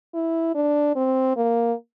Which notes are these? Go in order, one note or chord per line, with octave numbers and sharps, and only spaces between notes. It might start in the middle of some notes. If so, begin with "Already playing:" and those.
E4
D4
C4
A#3